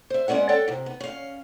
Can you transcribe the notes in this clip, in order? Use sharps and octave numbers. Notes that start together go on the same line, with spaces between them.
C5 E5
G#3 B3 C#4 D5 F#5
A4 C#5 F#5 G5
C3 D#3
B3
C#4 F5